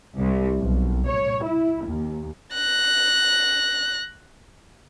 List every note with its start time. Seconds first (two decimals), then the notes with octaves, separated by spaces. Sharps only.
0.19 C2
0.60 B1
1.08 C#5
1.45 E4
1.86 D#2
2.54 F#6 A#6